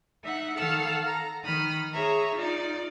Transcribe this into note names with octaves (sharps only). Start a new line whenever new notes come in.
D#4 E5 F#5
D#3 A4 F5 F#5 E6
A#5
D#3 B5 D#6 F6
G#4 C#5 E5 A#5
D#4 F4 D5